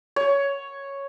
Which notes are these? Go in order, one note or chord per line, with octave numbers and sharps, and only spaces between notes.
C#5